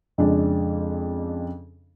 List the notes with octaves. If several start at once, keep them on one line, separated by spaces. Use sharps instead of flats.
F2 C#3 G#3 D4